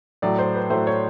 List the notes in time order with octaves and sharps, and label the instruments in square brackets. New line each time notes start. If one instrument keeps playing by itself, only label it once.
[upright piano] A2 F#3 A3 D5
C5
B4
A2 F#3 A3 C5
C#5